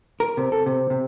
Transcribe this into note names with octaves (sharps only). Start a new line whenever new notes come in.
A#4
C3
A4
C3
C3